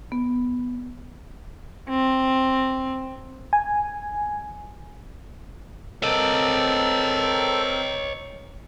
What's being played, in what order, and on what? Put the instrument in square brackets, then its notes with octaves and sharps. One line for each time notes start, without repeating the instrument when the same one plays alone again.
[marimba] B3
[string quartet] C4
[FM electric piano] G#5
[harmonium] C4 A#4 G5 [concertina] A4 [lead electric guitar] C#5 D#5